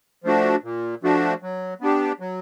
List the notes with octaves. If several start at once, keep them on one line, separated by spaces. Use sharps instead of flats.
F3 A3 D4 F#4
A#2
F3 A3 D4 F#4
F#3
B3 D4 G4
F#3